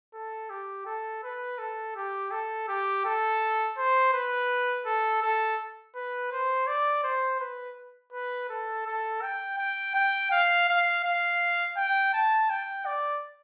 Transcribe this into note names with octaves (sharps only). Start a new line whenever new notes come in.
A4
G4
A4
B4
A4
G4
A4
G4
A4
C5
B4
A4
A4
B4
C5
D5
C5
B4
B4
A4
A4
G5
G5
G5
F5
F5
F5
G5
A5
G5
D5